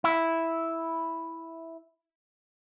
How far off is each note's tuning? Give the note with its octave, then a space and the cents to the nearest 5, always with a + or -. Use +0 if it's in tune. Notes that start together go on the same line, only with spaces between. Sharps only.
E4 -5